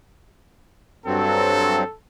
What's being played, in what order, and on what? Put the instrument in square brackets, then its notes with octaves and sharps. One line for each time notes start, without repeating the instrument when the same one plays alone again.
[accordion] G2 F#3 C4 [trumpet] A4